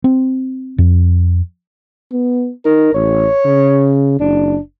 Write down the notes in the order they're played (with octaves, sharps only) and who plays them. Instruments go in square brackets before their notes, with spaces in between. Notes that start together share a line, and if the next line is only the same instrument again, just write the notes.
[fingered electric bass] C4
F2
[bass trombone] B3
[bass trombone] D#4 [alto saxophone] A#4
[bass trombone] A1 [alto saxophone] C#5
[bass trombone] C#3
[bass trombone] F#1 [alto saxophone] D4